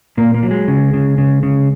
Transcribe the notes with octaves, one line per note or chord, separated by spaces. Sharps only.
A#2 A#3
A#3
F#3
G#3
C#3
C#3
C#3
C#3